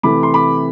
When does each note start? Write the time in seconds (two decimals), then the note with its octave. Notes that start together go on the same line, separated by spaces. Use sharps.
0.03 C3 E3 A3 B5 D6
0.23 C6
0.34 B5 D6